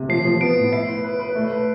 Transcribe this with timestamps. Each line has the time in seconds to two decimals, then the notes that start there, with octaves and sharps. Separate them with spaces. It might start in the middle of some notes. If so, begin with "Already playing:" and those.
Already playing: C3
0.09 F3 C7
0.25 F3
0.41 B3 D7
0.56 A2
0.72 E4 C7
0.88 B4
1.04 B4
1.19 B4
1.35 A3
1.52 B4